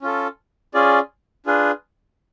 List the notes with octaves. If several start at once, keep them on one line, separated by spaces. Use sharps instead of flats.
C#4 F4 A4
C#4 F4 G#4 D5
D4 F4 G#4 B4